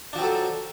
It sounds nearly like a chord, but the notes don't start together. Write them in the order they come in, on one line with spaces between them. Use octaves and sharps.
D4 F3 C4 F#3 A4